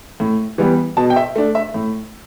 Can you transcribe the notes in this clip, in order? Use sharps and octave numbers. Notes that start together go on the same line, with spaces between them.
A2
E3 G3 B3
B2 A5
G5
E5
A3 D4
E5
A2